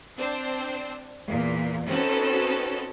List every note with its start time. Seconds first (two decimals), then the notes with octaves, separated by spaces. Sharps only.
0.18 C4 D4 C5
1.27 E2 A#2
1.87 C4 C#4 D#4 F#4 A4 B4